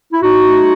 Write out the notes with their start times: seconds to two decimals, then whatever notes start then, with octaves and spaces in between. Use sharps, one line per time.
0.12 E4
0.22 A2 D#4 F#4
0.43 A3